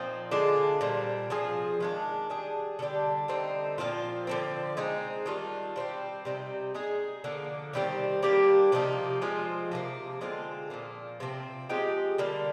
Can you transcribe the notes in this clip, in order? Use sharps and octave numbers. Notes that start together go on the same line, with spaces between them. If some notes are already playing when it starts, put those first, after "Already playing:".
Already playing: A#2 F3 C4 D#4
D3 G#3 D4 F4
A#2 G3 C4
F3 C4 F4 G#4
D#3 G#3 D4
G3 D4 G#4
D3 G3 D4 G4
D3 G3 C4 D#4
A#2 F3 C4 F4
D3 F3 C4
G#3 C4 D#4
D#3 G3 D4 F4
G3 C4 G4
C3 G3 C4 D#4
G#3 D#4 G#4
D3 F3 A#3
D#3 G3 C4 G4
G3 A#3 D4 G4
C3 F3 A#3 D#4
F3 G#3 C4 F4
C3 F3 A#3
D3 G#3 C4 F4
A#2 F3 A#3
C3 F3 C4
F3 G#3 D#4 G4
D3 G3 A#3